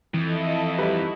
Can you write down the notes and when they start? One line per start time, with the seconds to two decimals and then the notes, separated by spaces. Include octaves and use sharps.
0.14 F2 E3 E4 A4 D#5
0.78 G3 D#4 E4 F#4 B4